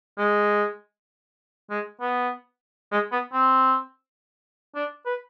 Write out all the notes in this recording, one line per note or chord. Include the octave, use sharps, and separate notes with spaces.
G#3
G#3
B3
G#3
B3
C4
D4
B4